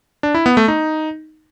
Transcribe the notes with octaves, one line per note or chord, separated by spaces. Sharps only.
D4
E4
B3
A3
D#4